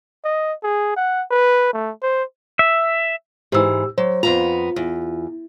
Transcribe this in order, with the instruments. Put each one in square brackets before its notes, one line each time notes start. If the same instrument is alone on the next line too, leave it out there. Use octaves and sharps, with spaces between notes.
[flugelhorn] D#5
G#4
F#5
B4
A3
C5
[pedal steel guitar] E5
[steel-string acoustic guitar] G#2 E3 [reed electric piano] G4 E6
[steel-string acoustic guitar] F#3 [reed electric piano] C5
[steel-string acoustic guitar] F2 B3 A#5 [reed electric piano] F4
[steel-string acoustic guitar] E2